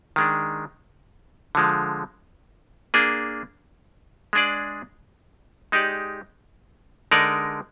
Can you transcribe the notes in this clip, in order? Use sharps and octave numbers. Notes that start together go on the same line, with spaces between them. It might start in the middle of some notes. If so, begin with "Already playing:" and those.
D#3 G#3 D4
D3 F3 G#3
A#3 D4 G#4
G#3 D4 G#4 D5
G#3 D#4 G4 D5
D3 G#3 D#4 A#4 D5